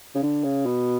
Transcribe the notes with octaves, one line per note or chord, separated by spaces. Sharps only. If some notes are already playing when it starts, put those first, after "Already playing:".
C#3
D3
C#3
B2